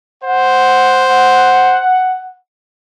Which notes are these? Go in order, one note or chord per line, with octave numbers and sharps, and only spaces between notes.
C5 F#5